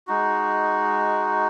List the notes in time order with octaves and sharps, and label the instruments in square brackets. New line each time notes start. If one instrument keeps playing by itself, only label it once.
[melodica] G#3 D#4 F#4